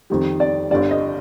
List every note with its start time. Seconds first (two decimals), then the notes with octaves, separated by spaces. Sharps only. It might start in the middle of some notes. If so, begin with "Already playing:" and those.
0.10 F2 D#3 G3
0.40 D5
0.70 G1 G2 D3 G3 D5
0.91 D#5